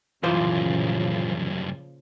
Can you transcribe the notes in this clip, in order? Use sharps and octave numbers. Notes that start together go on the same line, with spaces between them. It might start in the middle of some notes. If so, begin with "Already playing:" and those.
C2 F#2 A#2 C#3 E3 F3 F4 C5